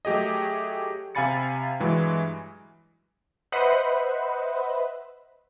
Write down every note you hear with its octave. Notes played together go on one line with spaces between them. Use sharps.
F#3 A3 G4 G#4 D#5
C3 F5 G#5 B5 A6 C#7
G2 E3 F#3 G#3
B4 C5 D#5 E5 F#5 B5